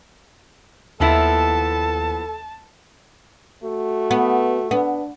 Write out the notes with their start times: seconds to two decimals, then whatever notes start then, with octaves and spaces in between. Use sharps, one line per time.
1.00 D#2 F3 B3 E4 A4 A5
3.64 A3 F#4
4.11 B3
4.71 B3 D4